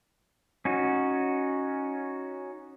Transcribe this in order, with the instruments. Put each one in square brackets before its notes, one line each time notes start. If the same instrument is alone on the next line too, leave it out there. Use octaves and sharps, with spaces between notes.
[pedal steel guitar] C#4 D#4 F#4